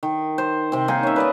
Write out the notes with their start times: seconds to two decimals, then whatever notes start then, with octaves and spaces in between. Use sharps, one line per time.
0.03 D#3
0.38 C5
0.72 C3 C4
0.88 A#3 D#4 G#4
1.03 C#4 E5
1.16 B4 D5 D#5